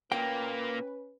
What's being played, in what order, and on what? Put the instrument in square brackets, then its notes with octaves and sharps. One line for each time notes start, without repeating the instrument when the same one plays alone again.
[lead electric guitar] A#2 A#3 [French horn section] C#4 B4 [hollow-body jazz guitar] G5